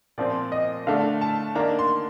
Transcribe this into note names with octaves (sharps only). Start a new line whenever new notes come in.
A#2 F3 C4 D5
D#5
D3 A3 D4 F5
A5
D#3 A#3 D4 A#5
C6